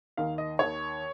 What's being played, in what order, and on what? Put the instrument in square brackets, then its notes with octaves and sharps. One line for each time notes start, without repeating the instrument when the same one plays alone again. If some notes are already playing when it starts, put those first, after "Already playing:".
[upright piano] D#2 D#3 F5
D#5
D#2 D#3 C#5